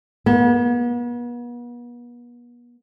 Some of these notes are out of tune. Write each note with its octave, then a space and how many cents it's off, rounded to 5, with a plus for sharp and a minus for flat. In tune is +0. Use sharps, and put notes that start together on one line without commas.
B3 -40